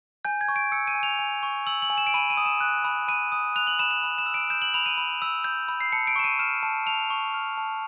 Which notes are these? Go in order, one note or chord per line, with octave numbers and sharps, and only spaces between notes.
G#5 G6
G#6
C#6
D7
E6 C#7
D#7
G#5
F7
G#5
C#6
E6 F#7
F#7
G#5
E7
D7
B5 D#7
D#7
D#6
E7
F#6
B5
B5 D#7
D#6
F#6 F7
F#7
B5 E7
E7
B5
E7
E6
D7
G6 E7
F#7
B5 F7
D#7
B5
E6
G6
B5
C7
A5 C#7
D7
C#6 E7
D#7
F6 E7
A5
A5 F7
C#6
F6
A5